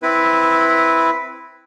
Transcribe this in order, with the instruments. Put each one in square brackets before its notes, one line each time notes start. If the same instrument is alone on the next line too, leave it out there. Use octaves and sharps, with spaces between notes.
[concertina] C4 E4 B4